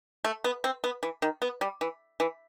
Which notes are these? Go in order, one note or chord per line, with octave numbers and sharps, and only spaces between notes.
A3
B3
C4
B3
E3
D#3
B3
G3
E3
E3